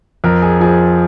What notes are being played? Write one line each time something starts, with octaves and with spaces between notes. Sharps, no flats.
F2 A#4
G#4
F3 G#4